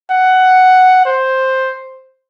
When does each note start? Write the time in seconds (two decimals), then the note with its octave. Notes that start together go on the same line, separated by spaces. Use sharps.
0.10 F#5
1.06 C5